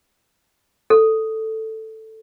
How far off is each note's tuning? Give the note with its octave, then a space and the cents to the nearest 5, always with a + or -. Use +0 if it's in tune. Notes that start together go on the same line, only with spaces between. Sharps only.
A4 +5